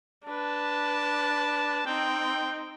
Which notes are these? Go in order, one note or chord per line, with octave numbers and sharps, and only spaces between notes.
D4 B4 A5
C4 D#4 G5